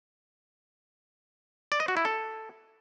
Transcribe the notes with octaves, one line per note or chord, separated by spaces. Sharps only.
D5
D#5
F#4
E4
A4